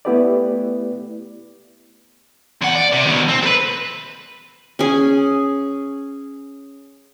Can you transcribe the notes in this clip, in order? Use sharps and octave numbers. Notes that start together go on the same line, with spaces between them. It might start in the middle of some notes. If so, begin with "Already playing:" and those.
A3 B3 E4 G4 B4 D5
E2 F#5
D5
C3
D#2 B2
C4
A4 B4
C#4 G#4